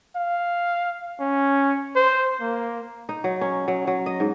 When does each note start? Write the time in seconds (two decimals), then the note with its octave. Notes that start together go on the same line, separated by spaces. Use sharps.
0.16 F5
1.20 C#4
1.96 C5
2.41 A#3
3.09 D#4
3.24 F#3
3.41 C#4
3.68 F#3
3.87 F#3
4.06 D#5
4.20 G#2